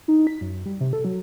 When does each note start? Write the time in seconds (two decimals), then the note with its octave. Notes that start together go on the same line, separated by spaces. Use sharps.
0.08 D#4
0.27 B6
0.41 F#2
0.66 G3
0.80 C3
0.93 A4
1.05 F#3